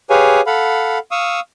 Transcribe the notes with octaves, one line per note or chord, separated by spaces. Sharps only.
G4 G#4 B4 C#5 F5 G#5
A4 F5 F#5 B5
F5 C#6 D#6 E6